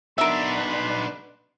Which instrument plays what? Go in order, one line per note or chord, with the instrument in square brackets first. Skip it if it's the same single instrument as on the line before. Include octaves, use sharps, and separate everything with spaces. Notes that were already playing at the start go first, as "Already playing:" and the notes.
[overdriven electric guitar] B3 D#4 [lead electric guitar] D4 [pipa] A#4 E5 [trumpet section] B5 C6